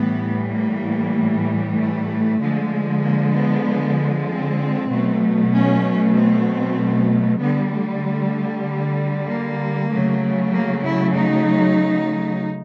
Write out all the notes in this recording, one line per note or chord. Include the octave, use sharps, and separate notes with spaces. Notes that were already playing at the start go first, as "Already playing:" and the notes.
Already playing: A2 E3 G3 B3
A#3
A3
D3 F3 G#3
A#3
B3
C4
B2 F#3 A3
C#4
C4
D3 G3 B3
A3
A#3
C#3 F#3 A3
A#3
E4
D#4